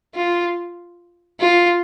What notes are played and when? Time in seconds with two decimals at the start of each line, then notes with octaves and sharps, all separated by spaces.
0.15 F4
1.40 F4